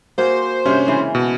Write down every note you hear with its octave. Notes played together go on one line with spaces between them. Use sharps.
A#3 F#4 G#4 C5
G2 C3 C#4 F5
C#3 E3 G#3
B2